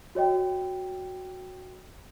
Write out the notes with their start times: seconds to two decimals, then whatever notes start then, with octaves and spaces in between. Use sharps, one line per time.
0.15 F#4 C#5 D#5 G5